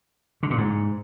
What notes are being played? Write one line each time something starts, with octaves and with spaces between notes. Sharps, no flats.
D3
A#2
G#2